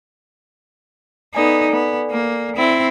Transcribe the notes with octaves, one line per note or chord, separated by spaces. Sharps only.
B3 D#4 A4 D5 G#5
B3
A#3
C4 E4